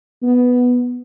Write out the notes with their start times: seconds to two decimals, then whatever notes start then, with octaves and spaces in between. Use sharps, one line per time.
0.23 B3